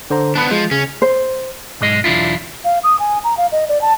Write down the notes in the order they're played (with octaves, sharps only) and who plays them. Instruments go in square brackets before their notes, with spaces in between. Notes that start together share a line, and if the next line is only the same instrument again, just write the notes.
[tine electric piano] D3 C5 A#5
[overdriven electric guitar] B3 D4 [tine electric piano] A5 B5 F#6
[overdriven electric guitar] F3 [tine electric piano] G#3
[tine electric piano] C#3 [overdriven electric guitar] C#4
[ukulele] C5
[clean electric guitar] B1 G#2 G#3 D#5
B1 E2 D4 E4 F4
[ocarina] F5
D#6
G#5
A#5
F5
D#5
D5
A5